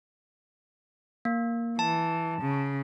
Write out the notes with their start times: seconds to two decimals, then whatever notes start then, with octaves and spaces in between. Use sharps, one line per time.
1.25 A#3
1.79 E3 A5
2.41 C#3